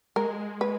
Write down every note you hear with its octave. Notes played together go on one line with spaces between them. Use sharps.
G#3 A#4
B4